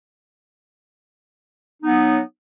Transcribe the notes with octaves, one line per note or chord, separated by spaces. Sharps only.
F#3 B3 D#4